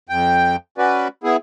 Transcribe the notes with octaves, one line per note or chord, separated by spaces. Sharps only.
F2 G5
C#4 F#4 B4 D5
B3 E4 G#4